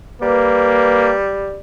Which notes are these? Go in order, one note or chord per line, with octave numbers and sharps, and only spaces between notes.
G3 A#3 B4